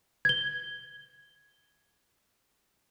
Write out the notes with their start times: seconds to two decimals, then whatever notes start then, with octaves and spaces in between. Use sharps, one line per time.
0.25 G#6 G7